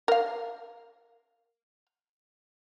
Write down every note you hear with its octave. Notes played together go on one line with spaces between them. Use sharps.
A#4 F5